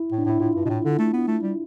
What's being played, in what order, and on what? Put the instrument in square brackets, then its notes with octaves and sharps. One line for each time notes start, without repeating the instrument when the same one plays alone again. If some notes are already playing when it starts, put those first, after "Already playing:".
Already playing: [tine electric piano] E4
[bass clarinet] A2
[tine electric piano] D4
[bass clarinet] A2 [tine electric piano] E4
[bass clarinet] A2 [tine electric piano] F4
[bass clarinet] G2
B2
A2
D3
A3
B3
A3
G3